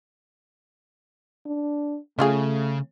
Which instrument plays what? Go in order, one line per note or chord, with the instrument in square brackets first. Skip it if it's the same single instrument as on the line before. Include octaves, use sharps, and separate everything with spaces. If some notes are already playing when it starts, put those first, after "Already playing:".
[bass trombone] D4
[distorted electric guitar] C#3 [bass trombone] A3 [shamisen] C#4 F4 G#4